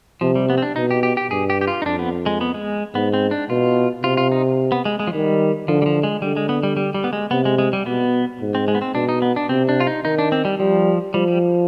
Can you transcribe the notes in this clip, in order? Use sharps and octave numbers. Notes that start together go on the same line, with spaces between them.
C3 F3
G3
B3
C4
D4
B2 D#4
G4
G4
G4
G2 G#4
G4
G4
F4
D#4
F2 D4
B3
G#3
B3
G#3
G#2 B3
C4
D4
B2 F4
C3 F4
F4
D#4
B3
G#3
G#3
F3
D#3 G3
D3 F3
G3
F3
G#3
D3 G3
G#3
B3
G3
G3
G3
B3
G#3
C3 B3
G#3
G#3
G3
B2 B3
G#2
C4
G#3
B3
C4
B2 D4
D#4
B3
D4
C3 C4
D4
F4
D#4
D#3 D#4
D4
C4
G3
F3 G3
F3 G3
G3